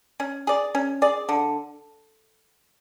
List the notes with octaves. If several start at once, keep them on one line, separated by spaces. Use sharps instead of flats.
C#4
G#4 D5
C#4
G#4 D5
D3